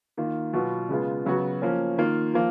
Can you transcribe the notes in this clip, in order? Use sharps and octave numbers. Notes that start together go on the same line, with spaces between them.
D#3 A#3 F4
B2 F#3 B3 F4
C#3 G#3 B3 F4
C#3 F#3 B3 F#4
F3 A#3 C#4
D#3 A#3 F4
F3 A#3